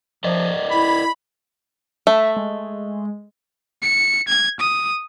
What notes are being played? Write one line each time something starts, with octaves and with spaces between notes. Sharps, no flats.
F3 A#4 D5 D#5
E4 B5
A3 E5
G#3
C#7
G#6
D#6